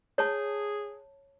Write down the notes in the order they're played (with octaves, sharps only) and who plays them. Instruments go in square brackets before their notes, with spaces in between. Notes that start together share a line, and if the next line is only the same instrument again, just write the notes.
[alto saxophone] G#4 [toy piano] C#5 A5